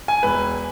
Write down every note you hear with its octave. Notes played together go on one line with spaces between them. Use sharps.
G#5
E1 B4